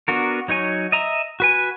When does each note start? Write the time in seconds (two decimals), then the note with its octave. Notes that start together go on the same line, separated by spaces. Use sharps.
0.08 B3 D4 F#4 A#4
0.48 F#3 D#4 C#5 G#5
0.92 D#5 E5 A#5
1.40 F#4 B4 G#5